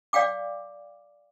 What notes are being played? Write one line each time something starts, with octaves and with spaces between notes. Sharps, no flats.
D5 F5 G5 D6